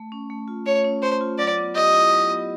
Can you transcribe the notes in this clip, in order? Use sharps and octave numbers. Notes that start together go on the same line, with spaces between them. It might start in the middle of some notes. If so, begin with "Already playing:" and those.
Already playing: A3
C#4
A3
F4
A3 C#5
C#4
A3 C5
F4
F#3 D5
B3
G4 D#5
E4
F#3
B3